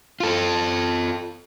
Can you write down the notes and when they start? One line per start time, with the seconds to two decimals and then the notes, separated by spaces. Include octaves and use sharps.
0.20 F4 A4